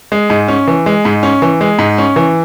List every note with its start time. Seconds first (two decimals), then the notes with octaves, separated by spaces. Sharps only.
0.12 G#3
0.30 G#2
0.48 C#4
0.67 E3
0.86 G#3
1.05 G#2
1.23 C#4
1.42 E3
1.61 G#3
1.79 G#2
1.98 C#4
2.16 E3